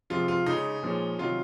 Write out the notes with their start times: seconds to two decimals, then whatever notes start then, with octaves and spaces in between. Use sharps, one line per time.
0.10 C3 F3 G#3 F4
0.28 F4
0.46 C#3 G#3 C#4 D#4
0.83 A#2 F3 G#3 C#4
1.18 C3 D#3 F#3 F4